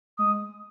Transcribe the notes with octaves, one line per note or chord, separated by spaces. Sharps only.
G#3 D#6